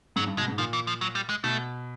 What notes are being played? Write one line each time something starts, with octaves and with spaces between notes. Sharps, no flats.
G#2 F#3
G2
B2 G#3
G#2
A#2 F3
E3
F3
F#3
G3
G#3
B2 A3